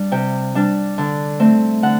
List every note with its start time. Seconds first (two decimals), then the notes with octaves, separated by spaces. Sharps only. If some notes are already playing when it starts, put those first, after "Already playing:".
Already playing: G3 D4
0.12 C3 G5
0.55 G3 D4
0.98 D3
1.40 A3 C4
1.83 D3 F#5